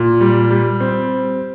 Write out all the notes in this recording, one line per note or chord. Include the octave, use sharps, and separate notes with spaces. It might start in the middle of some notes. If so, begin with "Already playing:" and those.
Already playing: A#2
G3
G3
C4